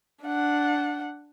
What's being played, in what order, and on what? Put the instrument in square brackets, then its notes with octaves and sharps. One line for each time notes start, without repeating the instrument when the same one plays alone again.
[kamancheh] D4 F#5